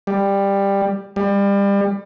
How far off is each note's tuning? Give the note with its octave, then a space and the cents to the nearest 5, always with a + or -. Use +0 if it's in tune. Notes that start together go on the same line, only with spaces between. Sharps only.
G3 +15
G3 +30